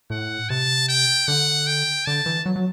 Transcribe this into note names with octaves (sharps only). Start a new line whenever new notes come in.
A2 F#5
C3 A5
G5
D3 F#5
G5
D3 A5
E3
F#3
F#3